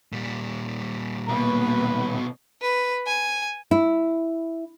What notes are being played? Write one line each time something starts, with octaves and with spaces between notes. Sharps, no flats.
A#2 G3
B1 B2 A#3 B4
B4
G#5
E4